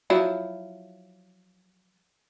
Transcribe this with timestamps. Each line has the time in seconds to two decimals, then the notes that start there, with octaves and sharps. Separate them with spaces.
0.10 F3 F#3 E4